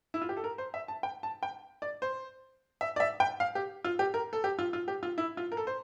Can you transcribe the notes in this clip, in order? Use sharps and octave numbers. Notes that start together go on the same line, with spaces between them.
E4
F4
G4
A4
A#4
C5
E5
A5
G5
A5
G5
D5
C5
E5
D5
E5
G5
F5
G4
F4
G4
A#4
A4
G4
F4
F4
G4
F4
E4
F4
A#4
A4
C5